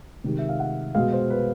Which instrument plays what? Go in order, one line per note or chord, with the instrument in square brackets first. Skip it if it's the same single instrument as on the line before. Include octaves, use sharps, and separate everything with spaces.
[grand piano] C3 D#3 G#3
E5
F5
F#5
B2 G#3 F5
C5
B4